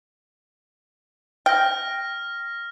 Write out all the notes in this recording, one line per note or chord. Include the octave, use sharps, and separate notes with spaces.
G5 F6 A#6